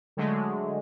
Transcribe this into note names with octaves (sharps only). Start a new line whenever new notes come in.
D3 F#3 G#3 A3